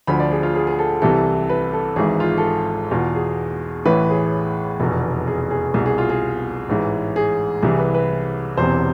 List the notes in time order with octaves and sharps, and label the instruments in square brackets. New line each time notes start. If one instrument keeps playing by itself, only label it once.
[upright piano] D2 D3 F3 B5
D5
G#4
F4
G#4
G#4
A4
C2 C3 E3 A4
B4
A4
G#1 G#2 E3 G#4
F4
A4
G#4
E2 B2 F4
G#4
A1 A2 E3 B4
G#4
F1 E2 B2
G#4
G#4
C2 B2 G#4
G#4
F4
G#4
A1 G#2 E3
G#4
C2 C3 E3 G#4
B4
B4
E1 E2 C3 C5